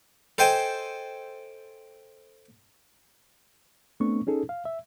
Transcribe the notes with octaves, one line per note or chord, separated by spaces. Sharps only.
A4 C5 D#5 G5 G#5
A3 B3 C4 D4 C#6
C#4 D#4 G#4 A4
F5
E5